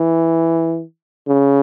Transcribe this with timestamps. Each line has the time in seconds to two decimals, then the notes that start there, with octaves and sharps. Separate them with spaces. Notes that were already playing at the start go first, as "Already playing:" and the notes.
Already playing: E3
1.27 C#3